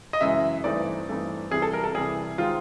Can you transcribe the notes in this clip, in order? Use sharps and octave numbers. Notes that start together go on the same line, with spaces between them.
D#5
F#2 C#3 E3 G#3 E5
G2 E3 A3 C4 D#4 D5
G2 E3 A3 C4 D#4
C2 C3 E3 G3 G#4
A4
A#4
A4
C2 C3 E3 G3 G#4
D#3 G#3 C4 D#4 F4